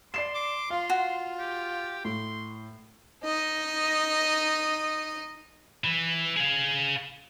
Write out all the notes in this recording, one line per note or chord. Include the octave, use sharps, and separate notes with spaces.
D5 C6 C7 E7
D6
F4 F5
F#4
G4
A2 C6
D#4 D#5
E3
G#4 F5